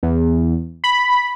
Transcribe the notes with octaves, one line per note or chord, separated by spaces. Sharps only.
E2
B5